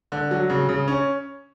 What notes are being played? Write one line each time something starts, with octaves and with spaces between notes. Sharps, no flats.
D3
F#3
C#3
C#3
C#4